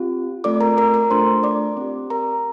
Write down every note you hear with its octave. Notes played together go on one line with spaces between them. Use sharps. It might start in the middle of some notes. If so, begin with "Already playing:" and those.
Already playing: C4 F4 G4
A3 C4 F4 A4 D5 D6
A#4 A#5
A#4 A#5
A#4 A#5
A3 D4 F4 A4 C5 C6
D5 D6
C4 G4
A#4 A#5